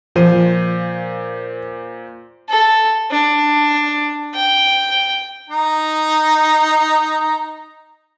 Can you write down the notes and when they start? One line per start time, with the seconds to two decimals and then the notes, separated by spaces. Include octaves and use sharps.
0.16 A#2 F3 C5 D#7
2.49 A4
3.11 D4
4.34 G5
5.50 D#4 A#5